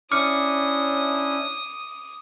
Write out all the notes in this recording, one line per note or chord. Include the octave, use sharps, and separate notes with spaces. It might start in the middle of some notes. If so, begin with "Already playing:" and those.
C#4 D4 E4 D6 D#6 F6 C#7